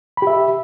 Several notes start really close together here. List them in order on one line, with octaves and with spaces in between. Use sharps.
B5 G4 E5